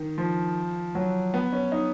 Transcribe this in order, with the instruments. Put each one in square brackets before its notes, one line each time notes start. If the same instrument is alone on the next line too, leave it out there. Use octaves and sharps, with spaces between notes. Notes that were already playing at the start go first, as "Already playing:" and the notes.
Already playing: [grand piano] D#3
F3
F#3
B3
C#4
D#4